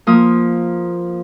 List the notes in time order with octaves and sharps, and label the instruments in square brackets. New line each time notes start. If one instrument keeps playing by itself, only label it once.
[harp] F3 A#3 D#6